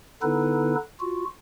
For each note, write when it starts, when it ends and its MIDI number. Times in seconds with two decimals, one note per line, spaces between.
0.22 0.75 50
0.22 0.75 59
0.22 0.75 63
0.22 0.75 64
0.22 0.75 69
0.22 0.75 71
1.00 1.25 65
1.00 1.25 66